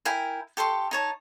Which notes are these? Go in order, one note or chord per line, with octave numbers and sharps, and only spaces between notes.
E4 A#4 G5 G#5
G4 A4 C6 C#6
D#4 C#5 A5